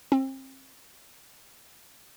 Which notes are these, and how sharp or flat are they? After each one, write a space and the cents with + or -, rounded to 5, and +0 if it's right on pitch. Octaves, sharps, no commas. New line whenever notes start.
C4 +35